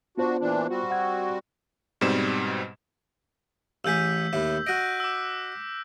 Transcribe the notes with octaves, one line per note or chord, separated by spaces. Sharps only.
B3 D4 F4 F#4 C5
A#2 E3 D4
G3 C4 F#4
F#5 G#6
G#2 B2 G3 C4 E7
A1 A2 G#4 E6 G6 B6
D#2 A2 E4
F#4 D#5 F#6 A#6 D7
D6 E6